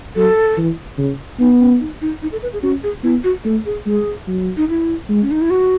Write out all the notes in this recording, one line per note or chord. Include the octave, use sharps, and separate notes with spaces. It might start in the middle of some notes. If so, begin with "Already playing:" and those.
F#3 A4
E3
C#3
B3 D#4
C#4
D#4
D#4
D#4
A4
B4
G#4
C#4 F#4
G#4
B3 E4
F#4
A3 A4
G#4
G#3 G#4
F#3
D#4
E4
G#3
C#4
D#4
E4
F#4